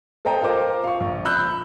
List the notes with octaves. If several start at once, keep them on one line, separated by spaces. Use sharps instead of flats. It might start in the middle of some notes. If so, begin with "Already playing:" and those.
A4 C5 D#5 G5 A#5
F4 A#4 C5 D6
F5 C#6
A#1
B5 E6 F#6 G6